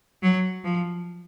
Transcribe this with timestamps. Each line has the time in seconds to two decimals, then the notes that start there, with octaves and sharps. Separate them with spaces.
0.23 F#3
0.64 F3